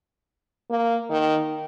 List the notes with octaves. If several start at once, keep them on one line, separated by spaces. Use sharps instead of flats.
A#3
D#3